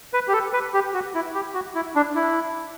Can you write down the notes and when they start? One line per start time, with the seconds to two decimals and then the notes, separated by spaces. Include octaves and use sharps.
0.13 B4
0.28 G4
0.33 A4
0.53 B4
0.74 G4
0.94 F#4
1.15 E4
1.35 G4
1.54 F#4
1.75 E4
1.96 D4
2.15 E4